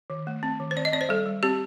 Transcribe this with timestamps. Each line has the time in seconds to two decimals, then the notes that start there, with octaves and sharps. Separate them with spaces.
0.10 D#3
0.27 A3
0.43 C4
0.60 D#3
0.71 C5
0.76 C4 D5
0.85 D#5
0.92 C4 D5
1.01 C5
1.09 G3 A4
1.26 G3
1.43 C4 G4